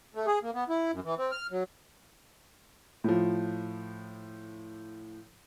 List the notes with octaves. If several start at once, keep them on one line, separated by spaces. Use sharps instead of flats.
A3
G#4
A#3
B3
E4
F#2
E3
C4
F6
F#3
A2 F3